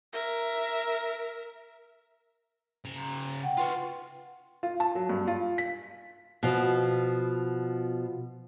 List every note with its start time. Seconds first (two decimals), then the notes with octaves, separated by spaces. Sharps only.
0.13 A#4 E5
2.85 C#3 A#5
3.44 F#5 G5
3.58 F4 F#4 B4 C6
4.63 F4
4.80 A5
4.95 F#3
5.10 G2
5.28 F4
5.58 B6
6.43 B2 F3